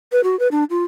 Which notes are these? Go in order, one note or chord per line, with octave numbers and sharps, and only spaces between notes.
B4
F#4
B4
D4
F4